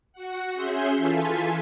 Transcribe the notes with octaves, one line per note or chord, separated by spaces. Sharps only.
F#4 F#5
C#4 G#4 E5 C6 G6
E3 F4 A4 G#5 B6